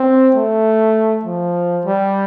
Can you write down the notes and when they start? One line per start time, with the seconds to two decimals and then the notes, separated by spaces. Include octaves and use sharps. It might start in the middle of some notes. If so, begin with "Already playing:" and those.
Already playing: C4
0.35 A3
1.25 F3
1.86 G3